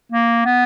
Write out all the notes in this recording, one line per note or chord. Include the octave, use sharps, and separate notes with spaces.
A#3
B3